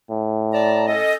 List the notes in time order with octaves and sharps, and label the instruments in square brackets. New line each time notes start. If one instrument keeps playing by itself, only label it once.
[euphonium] A2
[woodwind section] D5 A5 A#5
C#4 A4 D#5